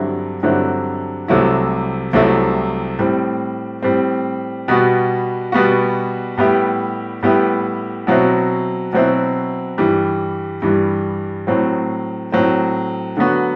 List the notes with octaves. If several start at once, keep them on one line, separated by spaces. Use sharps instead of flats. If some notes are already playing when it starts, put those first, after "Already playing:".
Already playing: G2 D3 F#3 C4 E4
G2 D3 F#3 C4 E4
C2 C3 F#3 A3 E4
C2 C3 F#3 A3 E4
A2 G3 C4
A2 G3 C4
B2 G3 B3 F#4
B2 G3 B3 F#4
A2 G3 B3 E4 G4
A2 G3 B3 E4 G4
B2 F#3 C4 E4
B2 F#3 C4 E4
G2 E3 G3
G2 E3 G3
A2 F#3 C4
A2 F#3 C4
D3 F#3 B3 F#4